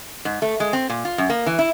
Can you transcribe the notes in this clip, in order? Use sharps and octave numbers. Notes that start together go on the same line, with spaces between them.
G#2
A3
G#3
C4
A#2
F4
F#2
A#3
E3
E4